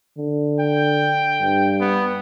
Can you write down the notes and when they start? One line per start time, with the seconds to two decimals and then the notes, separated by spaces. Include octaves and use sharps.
0.17 D3
0.60 G5
1.42 G2
1.81 B3